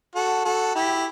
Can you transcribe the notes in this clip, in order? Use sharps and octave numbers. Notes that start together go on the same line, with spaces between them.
F#4 A4
F#4 A4
E4 G4